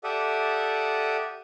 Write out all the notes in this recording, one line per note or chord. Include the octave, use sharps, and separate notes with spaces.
G4 A4 D5 E5 F#5 D#6